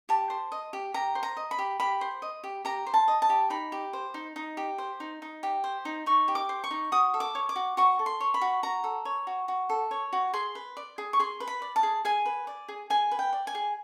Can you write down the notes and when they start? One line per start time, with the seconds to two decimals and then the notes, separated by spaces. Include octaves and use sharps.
0.09 G4 A5
0.30 C5
0.52 D#5
0.73 G4
0.94 G4 A#5
1.15 C5
1.23 A#5
1.37 D#5
1.51 B5
1.59 G4
1.80 G4 B5
2.01 C5
2.22 D#5
2.44 G4
2.65 G4 A#5
2.87 C5
2.94 A5
3.08 D#5
3.22 A5
3.30 G4
3.50 D#4 B5
3.72 G4
3.93 C5
4.14 D#4
4.36 D#4
4.57 G4
4.78 C5
5.00 D#4
5.22 D#4
5.43 G4
5.64 C5
5.85 D#4
6.06 D#4 C#6
6.28 G4
6.35 D6
6.49 C5
6.64 C#6
6.71 D#4
6.92 F#4 D#6
7.14 A4
7.20 D6
7.35 C#5
7.49 D6
7.56 F#4
7.77 F#4 C#6
7.99 A4
8.06 C6
8.20 C#5
8.34 B5
8.41 F#4
8.63 F#4 A#5
8.84 A4
9.05 C#5
9.27 F#4
9.48 F#4
9.70 A4
9.91 C#5
10.13 F#4
10.33 G#4 C6
10.55 B4
10.77 D5
10.98 G#4
11.13 C#6
11.19 G#4 C6
11.40 B4
11.48 B5
11.62 D5
11.76 A5
11.83 G#4
12.05 G#4 G#5
12.26 B4
12.47 D5
12.68 G#4
12.90 G#4 G#5
13.11 B4
13.19 G5
13.33 D5
13.47 G#5
13.55 G#4